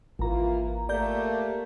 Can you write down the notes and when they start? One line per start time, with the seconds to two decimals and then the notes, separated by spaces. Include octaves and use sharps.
0.19 G#1 E3 A#3 F4 A#5
0.89 A3 A#3 G4 D5 A#5 G6